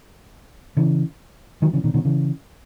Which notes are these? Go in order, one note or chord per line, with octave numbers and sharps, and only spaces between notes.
C#3 E3
D#3 F#3
C#3 E3
B2 D#3
B2 D#3
C#3 E3